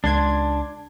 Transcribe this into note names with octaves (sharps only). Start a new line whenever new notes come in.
C#2 D4 C6 G#6